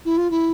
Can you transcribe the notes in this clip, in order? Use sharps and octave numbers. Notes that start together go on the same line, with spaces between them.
E4
F4
E4